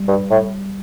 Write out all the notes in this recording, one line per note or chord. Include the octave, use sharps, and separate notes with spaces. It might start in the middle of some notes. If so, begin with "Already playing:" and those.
Already playing: G3
G2
A2